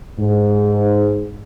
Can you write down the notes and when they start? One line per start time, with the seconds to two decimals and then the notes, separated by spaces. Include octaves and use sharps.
0.18 G#2